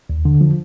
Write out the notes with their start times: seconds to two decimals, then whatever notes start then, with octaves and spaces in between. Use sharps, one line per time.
0.10 D#2
0.25 D3
0.41 F3